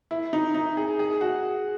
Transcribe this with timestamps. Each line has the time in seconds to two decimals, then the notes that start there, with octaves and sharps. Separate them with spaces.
0.11 E4
0.33 D#4
0.54 D#4
0.77 G#4
0.99 G#4
1.21 F#4